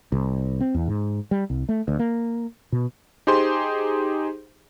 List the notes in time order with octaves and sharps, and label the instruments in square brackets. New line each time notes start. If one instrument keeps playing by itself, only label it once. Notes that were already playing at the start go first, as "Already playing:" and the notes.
[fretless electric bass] C2
C4
E2
G#2
G3
C2
A3
D2
A#3
B2
[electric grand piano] D#4 G4 G#4 C5 C6